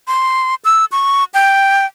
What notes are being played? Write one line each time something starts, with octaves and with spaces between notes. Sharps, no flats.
C6
E6
C#6
G5